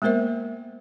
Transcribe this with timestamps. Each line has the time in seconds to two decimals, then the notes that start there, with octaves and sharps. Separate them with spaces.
0.02 G#3 A#3 B3 A#4 C5 E5